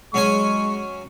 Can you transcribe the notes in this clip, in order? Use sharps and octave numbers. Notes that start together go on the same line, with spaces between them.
F#3 G#3 C#4 G#5 C#6